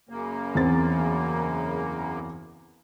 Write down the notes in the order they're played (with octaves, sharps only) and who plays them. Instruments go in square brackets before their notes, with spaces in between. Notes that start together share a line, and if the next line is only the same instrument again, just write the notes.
[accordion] F#2 C#3 A#3
[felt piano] E2 C4 A6